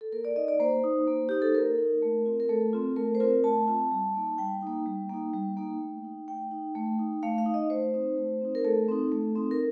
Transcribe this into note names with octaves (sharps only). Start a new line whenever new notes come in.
A4
A#3 A#4
D5
D#4 D#5
D5
A#3 C5
D#4
A#3
D#4 G4
A4
A#3 A#4
D#4
A3
C4 F4
A#4
A3 A4
C4 F4
A3 A#4
C5
C4 F4 A#4
A3 A5
C4 F4
G3
A#3 D#4
G3 G5
A#3 D#4
G3
A#3 D#4
G3
A#3 D#4
A3
D#4
A3 G5
D#4
A3
D#4
A3 F5
F5
D#4
D#5
A3 C5
C4 D#4
A3
C4 D#4
A#4
A3 A4
C4 D#4
A3
C4 D#4
A#4